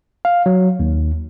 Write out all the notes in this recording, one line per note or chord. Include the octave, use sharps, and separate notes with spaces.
F5
F#3
D#2